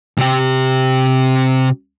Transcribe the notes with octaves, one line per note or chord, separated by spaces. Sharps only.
C3 G4